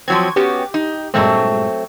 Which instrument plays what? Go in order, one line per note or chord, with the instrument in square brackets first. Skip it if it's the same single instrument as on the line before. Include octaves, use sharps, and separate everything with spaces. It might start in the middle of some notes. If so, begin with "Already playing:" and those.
[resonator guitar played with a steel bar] F3 F#3 C4 [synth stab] G#6
[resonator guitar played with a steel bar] B3 C#4 F#4 [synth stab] G4
[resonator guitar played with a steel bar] D#4
[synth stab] G2 A#2 G#3 [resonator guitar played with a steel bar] F#3 A3 C4